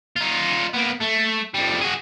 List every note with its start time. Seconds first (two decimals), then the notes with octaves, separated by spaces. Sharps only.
0.16 D#4 F4
0.73 A#3 B3
1.00 A3
1.54 F2 G3
1.81 F#4 G#4